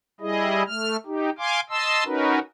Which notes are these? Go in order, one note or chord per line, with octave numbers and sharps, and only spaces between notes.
G3 E4 G#4 D#5
A3 F6
D#4 G4
F5 G#5 C6 D6
D#5 A5 C6 E6
C#4 D#4 F#4 A#4 B4